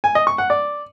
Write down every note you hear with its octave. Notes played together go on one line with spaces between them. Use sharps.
G#5
D#5
C#6
F#5
D5